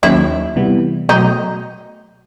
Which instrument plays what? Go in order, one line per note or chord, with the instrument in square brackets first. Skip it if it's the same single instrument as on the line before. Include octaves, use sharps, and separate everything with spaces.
[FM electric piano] D#2 D#3 F#3 A#3 C#4 [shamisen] E4
[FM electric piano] C3 E3 G3 B3
[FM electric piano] B2 F#3 A3 [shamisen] D#4